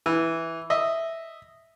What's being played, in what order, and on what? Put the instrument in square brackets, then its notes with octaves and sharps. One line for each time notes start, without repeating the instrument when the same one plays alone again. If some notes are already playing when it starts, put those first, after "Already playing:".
[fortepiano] E3
D#5 E5